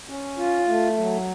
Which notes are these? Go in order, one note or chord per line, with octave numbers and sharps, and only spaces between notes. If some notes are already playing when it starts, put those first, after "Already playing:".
C#4
F4
A3
F#3